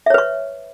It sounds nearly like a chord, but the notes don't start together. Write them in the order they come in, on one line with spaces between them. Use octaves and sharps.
E5 C#5 B4 C#6